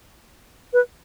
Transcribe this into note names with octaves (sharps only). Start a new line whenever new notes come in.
B4